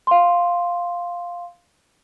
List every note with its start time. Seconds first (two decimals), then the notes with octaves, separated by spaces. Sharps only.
0.07 F5 C6